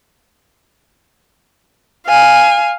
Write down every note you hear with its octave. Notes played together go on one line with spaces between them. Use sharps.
F5 G#5